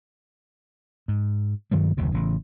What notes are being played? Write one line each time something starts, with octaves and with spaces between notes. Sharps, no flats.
G#2
G2 D#3 F#3 G3
F#1 D#2 C3
A1 C#3